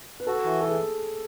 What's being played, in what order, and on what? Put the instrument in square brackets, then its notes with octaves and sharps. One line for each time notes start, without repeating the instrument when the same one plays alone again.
[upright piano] B4
[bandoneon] F#4 [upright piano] A4
[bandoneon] E3
[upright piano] A4
G#4